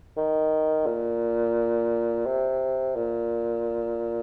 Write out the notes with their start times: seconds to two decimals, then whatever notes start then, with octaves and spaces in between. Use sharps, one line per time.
0.17 D#3
0.87 A#2
2.26 C3
2.96 A#2